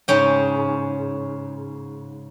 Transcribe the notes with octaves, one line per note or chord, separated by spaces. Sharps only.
G#2 C#3 C#4 G5